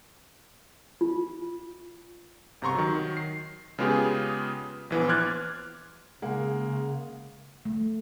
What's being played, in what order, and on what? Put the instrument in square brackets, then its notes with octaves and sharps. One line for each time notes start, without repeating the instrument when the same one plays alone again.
[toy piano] F4
[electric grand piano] G1 C3 A#5 C6 C#6
D#3 F#3
C7
C#3 G#3 B3 F4 G4 G#4
A#1 E3 B3
C6 D6 F6 F#6 G#6 A6
[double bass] C#3 [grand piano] G#3 A#3 F#5
[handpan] A3